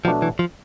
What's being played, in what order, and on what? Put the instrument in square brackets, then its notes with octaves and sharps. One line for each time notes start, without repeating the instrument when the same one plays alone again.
[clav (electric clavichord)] B2 F#3 A3 D4 [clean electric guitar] F3
[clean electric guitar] E3
F3